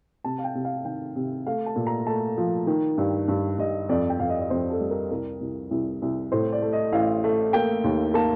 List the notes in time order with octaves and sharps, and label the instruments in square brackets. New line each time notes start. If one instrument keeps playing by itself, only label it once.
[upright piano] C3 A5
F5
G5
C3
F5
D#3 G5
C3
A3 F5
A5
A#2
A#5
A3 A5
F3
D#3
G2
G2
G2 D#5
F2 D5
G5
F2 F5
D#5
D5
F2 C5
A4
G3
A#4
C2 A#4
C2
C2
C2
A2 C5
D5
A3
D#5
A1 F5
A3
A#3 G5
D#2
A#3 A5